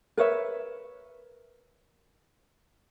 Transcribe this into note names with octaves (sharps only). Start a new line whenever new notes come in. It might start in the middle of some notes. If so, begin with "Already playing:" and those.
A#4 B4 C#5 E5